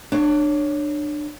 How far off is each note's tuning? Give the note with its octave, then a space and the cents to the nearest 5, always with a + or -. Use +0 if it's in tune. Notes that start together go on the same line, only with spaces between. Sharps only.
D4 +25 C#5 +5